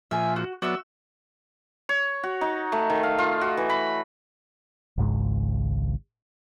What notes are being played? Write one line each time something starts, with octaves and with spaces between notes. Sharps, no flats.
A#2 F3 E5 G#5
F#4
F#3 B3 F#4 D5 E5 E6
C#5
F#4
D#4
A3
D#3
F5
F4
F#4
E3
B5
G#1 C#2 G#2